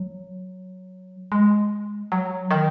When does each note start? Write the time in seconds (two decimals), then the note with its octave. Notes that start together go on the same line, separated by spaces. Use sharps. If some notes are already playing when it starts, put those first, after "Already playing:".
Already playing: F#3
1.32 G#3
2.12 F#3
2.51 D#3